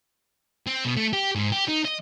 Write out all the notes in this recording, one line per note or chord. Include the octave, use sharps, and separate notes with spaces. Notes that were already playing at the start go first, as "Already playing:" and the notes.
C4
B2
A3
G4
G#2
G4
D#4
D#5